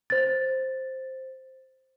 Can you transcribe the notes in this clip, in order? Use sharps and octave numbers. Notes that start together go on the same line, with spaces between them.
C5 A6